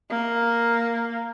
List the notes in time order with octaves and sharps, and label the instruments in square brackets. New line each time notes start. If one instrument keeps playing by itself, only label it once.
[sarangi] A#3